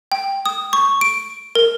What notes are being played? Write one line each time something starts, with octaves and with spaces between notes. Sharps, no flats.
G5
D#6
C#6
D7
A#4